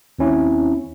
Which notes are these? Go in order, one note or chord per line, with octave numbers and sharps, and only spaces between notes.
D#2 C4 C#4 E4